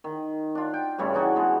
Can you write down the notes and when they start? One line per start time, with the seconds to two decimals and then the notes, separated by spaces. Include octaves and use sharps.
0.04 D#3
0.55 D4 F4
0.74 G5
0.98 G2 C#3 G3 A3
1.14 E3 D4 D#4 F#4
1.36 G#3 B3